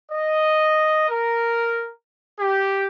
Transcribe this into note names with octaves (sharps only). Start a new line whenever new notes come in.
D#5
A#4
G4